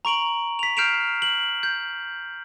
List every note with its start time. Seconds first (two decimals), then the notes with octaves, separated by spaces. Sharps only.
0.05 A#5 C#6 D7 F#7
0.59 B6 F7
0.77 F6 G6 C7 D7 E7 F7
1.22 F#7
1.63 G6